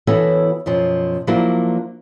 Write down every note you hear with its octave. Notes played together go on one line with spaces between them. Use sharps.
E3 B3 E4 F#4 A4 C#5
F#2 B2 F3
F3 F#3 A#3 D4 E4 F#4